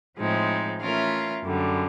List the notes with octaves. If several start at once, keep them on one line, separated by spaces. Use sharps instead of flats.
A2 F3 G#3 C4 D#4
E3 A3 C#4 F4 A#4
F#2 D3 G3